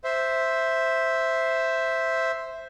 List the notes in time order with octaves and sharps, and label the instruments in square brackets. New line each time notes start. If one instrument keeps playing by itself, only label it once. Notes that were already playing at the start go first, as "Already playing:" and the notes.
[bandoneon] C5 E5